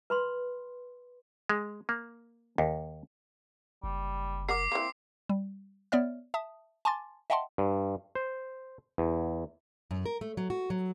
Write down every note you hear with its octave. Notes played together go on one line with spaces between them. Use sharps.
B4 B5 C6
G#3
A#3
D#2
F#1 G3
A#4 F#5 D6 C7
E3 A#3 C4
G3
B3 C#5 D5 E5 F6
E5 A5 D#6
G#5 A5 C6 D6 A6
D#5 E5 F#5 G5 A5 C6
G2
C5
E2
F#2
A#4
A3
F#3
F#4
F#3